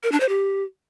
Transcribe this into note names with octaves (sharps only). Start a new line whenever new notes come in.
A#4
D4
C5
G4